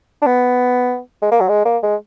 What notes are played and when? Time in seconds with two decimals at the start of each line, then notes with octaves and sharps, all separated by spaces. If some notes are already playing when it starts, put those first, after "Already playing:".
0.22 D4
0.26 B3
1.22 G#3
1.32 A#3
1.41 F#3
1.49 G#3
1.65 A#3
1.83 G#3